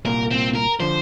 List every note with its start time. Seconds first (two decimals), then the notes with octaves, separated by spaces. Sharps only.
0.05 C2 A#2 A#3 A#4
0.31 C4
0.54 A#4
0.80 D3 F3 C5